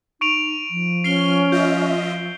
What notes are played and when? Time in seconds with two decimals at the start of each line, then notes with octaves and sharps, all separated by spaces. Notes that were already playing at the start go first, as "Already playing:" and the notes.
0.21 D#4 C#6 D7 F7
0.70 F3
1.04 C#4 F6 C7 G7
1.52 F4 D#5 E5 G6